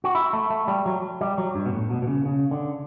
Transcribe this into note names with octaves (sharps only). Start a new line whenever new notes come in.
F#4
E4
A3
A3
G3
F#3
G3
F#3
G2
B2
A2
B2
B2
C#3
C#3
D3